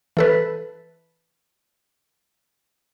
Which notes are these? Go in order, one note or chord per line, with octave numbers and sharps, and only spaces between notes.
E3 A4 B4